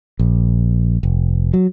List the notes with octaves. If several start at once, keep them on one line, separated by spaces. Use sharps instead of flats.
A#1
F1
F#3